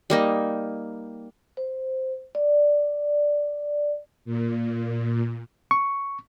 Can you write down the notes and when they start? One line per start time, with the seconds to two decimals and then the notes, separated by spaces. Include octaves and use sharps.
0.10 G3 A#3 D#4
1.57 C5
2.35 D5
4.25 A#2
5.71 C#6